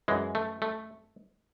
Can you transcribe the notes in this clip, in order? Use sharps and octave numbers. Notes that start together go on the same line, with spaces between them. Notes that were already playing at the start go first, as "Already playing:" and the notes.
F#2 E3 G#3
A3
A3